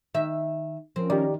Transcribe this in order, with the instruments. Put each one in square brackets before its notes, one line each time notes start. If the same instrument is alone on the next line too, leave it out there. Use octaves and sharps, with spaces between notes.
[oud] D#3 E5
[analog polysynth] F3 C#4 A#4 [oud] C4
[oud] D#3 [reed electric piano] G4 D5